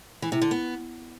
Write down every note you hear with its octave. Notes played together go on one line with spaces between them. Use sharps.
E3
C3
D3
B3